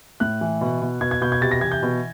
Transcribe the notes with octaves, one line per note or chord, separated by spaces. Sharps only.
A2 F#6
E3
B2
B2
B2 G#6
G#6
B2 G6
G#6
C3 A6
A#6
E3 G#6
G6
B2